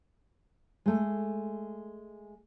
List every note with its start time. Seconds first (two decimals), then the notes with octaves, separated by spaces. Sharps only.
0.86 G#3 A3